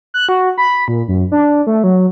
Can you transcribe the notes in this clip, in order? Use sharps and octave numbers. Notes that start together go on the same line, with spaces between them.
F#6
F#4
B5
A#2
F#2
D4
A3
F#3